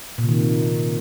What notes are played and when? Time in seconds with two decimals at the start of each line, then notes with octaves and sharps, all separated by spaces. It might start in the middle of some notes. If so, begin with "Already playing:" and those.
0.18 A#2
0.23 C3
0.29 D#3